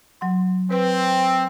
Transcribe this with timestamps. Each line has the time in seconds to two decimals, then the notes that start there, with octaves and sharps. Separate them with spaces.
0.21 F#3 F#5 C6
0.71 C4 B4